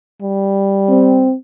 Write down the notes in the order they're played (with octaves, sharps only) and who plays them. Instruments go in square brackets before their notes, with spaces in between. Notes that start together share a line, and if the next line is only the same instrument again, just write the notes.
[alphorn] G3
[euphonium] C4